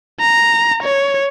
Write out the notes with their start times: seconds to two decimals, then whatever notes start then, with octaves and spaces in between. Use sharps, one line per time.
0.20 A#5
0.83 C#5